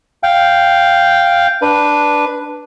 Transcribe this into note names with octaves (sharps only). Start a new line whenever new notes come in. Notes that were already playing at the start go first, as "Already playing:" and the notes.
F5 G5
D4 B4